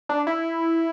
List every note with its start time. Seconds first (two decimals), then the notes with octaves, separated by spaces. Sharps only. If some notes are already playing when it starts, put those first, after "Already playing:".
0.09 D4
0.27 E4